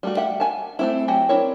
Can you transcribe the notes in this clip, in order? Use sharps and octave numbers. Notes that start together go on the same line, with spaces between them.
G3 A3 F#4
G4 E5 F#5
F#5 G#5 A5
A3 C4 E4
F#3 F#4 G4 G5 G#5
C4 D4 E4 A#4 C#5